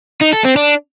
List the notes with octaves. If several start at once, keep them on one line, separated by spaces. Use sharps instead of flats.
D#4
A4
C4
D4